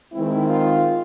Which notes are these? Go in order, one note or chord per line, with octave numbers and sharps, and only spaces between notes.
D#3 G#3 C4 E4
F4